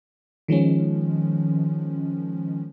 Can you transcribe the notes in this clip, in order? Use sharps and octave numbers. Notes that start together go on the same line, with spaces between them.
D#3 F3 G#3 C#4